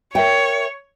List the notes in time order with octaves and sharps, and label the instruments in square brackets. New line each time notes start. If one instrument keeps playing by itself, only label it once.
[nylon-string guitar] A#4 E5 G5 [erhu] C#5